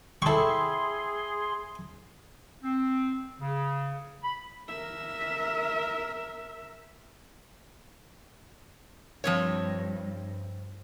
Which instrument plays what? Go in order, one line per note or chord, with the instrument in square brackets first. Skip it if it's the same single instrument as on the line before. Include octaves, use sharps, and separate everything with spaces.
[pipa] C4 E4 [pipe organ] G#4 C6 [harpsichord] A4 C#6
[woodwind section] C4
C#3
B5
[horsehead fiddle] A#4 E5
[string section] G2 [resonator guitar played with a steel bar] F3 C4 C#5